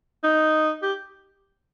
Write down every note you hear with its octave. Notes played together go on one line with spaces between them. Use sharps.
D#4
G4